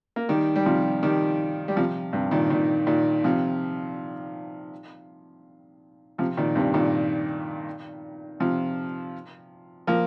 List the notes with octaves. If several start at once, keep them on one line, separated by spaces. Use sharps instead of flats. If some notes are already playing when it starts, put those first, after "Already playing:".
A#3
D#3 G3
G3
C3 F3
D#3 G3
G3
C3 F3
G2 C3
A#2 D#3
A#2 D#3
A#2 D#3
C3 F3
C3 F3
A#2 D#3
G2 C3
A#2 D#3
C3 F3
F3 A#3